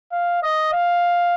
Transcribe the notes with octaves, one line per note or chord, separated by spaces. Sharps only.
F5
D#5
F5